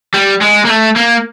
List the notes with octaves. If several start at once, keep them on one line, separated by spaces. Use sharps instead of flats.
G3
G#3
A#3
A3
A#3